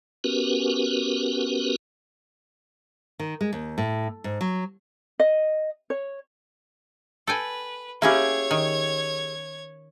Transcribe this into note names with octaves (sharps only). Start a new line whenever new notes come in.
B3 C#4 F#4 G4 A#4 B4
D#3
G#3
D#2
A2
G#2
F#3
D#5
C#5
A4 B4 G5 G#5
A#3 C#4 E4 G4 G#4 C#5 E5 G#6
D#3